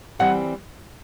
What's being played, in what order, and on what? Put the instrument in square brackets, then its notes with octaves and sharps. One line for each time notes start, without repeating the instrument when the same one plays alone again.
[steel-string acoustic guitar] E3 G3 C4 [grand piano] F#5